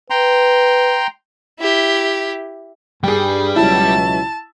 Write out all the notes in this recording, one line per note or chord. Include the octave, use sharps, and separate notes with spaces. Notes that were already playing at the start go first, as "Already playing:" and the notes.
B4 G5 A#5 C6
E4 G4
G2 G3 G#4 G5
C#2 B2 F#3 E4 A5